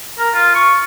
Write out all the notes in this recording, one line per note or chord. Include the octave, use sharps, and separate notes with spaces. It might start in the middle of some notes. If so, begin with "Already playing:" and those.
A#4
F4
C#6